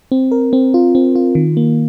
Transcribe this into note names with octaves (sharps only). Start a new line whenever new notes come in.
C4
A#4
C4
F4
C4
F4
D#3
A#3